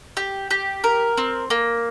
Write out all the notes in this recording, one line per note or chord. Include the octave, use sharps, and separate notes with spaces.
G4
G4
A#4
C4
A#3